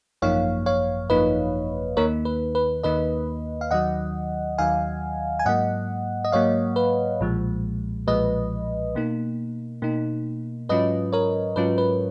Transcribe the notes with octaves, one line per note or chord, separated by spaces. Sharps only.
G#1 F#2 F3 A#3 D#4 C#5 F5
C#5 F5
G#1 F#2 F3 A#3 D#4 B4 D#5
D#2 D#3 A#3 D#4 A#4 C#5
B4
B4
D#2 D#3 A#3 D#4 B4 D#5
F5
D#2 D#3 F#3 D#5 F#5
D#2 D#3 F#3 F5 G#5
G#5
G#2 F#3 A#3 D#5 F#5
D#5
G#2 F#3 A#3 C#5 F5
B4
B1 A#2 F3 G#3
B1 A#2 F3 G#3 B4 D#5
B2 A#3 D#4
B2 A#3 D#4
G#2 F#3 C#4 F4 B4 D#5
A#4 C#5
G#2 F#3 C#4 F4 B4
B4